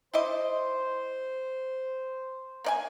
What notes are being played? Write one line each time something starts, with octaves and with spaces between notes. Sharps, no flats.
E4 C5 D5 D#5
A#3 D5 G#5